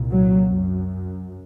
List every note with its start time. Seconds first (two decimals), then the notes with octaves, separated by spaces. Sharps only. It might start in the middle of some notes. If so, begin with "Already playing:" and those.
Already playing: C2 A#2
0.10 F#3
0.52 F#2